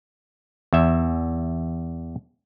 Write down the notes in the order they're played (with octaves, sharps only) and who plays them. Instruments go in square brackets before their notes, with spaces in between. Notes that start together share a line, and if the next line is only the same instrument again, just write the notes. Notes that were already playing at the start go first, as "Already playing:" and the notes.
[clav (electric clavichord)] E2 E5